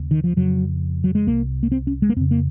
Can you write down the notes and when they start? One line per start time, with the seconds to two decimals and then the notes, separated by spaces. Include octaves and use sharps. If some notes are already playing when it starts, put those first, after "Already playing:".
Already playing: D#2 C#3
0.11 D#3
0.24 F3
0.36 F2 C#3 F#3
1.04 F#3
1.15 G#3
1.27 C2 C3 A#3
1.63 A#3
1.72 C4
1.87 C#4
2.02 G#3
2.09 A#3
2.16 F2 C4
2.21 C#3
2.31 A#3